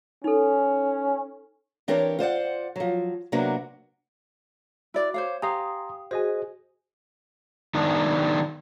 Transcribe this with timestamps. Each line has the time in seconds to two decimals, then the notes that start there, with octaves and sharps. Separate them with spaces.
0.24 C#4 D#4 A4
1.88 E3 C4 D4 G4 A#4 C#5
2.19 F4 C5 D5 F#5
2.76 F3 F#3
3.32 C3 F#3 A#3 B3 D4 F#4
4.94 E4 F#4 D5 D6
5.14 C5 C#5 F5
5.42 G4 F5 G#5 A#5 C6 D#6
6.11 F#4 G#4 C5 D#5 G#5
7.75 D#3 B3 D4